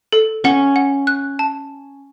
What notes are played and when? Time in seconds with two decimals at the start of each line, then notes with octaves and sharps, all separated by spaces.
0.12 A4
0.44 C#4 F#5
0.76 F#5
1.07 F#6
1.39 A5